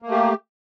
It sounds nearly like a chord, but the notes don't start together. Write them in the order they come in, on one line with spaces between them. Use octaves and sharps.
A#3 A3 G4